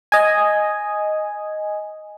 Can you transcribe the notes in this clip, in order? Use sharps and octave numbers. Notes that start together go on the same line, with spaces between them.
D#5 G#5